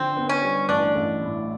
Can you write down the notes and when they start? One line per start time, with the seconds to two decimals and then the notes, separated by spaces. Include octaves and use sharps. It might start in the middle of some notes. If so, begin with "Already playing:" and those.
Already playing: D3 F3 C4
0.17 B3
0.29 C#4
0.42 G3
0.69 A1 D4
0.95 A1
1.22 A2